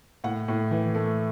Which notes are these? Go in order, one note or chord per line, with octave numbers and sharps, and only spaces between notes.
A2 F#5
A2
E3
A3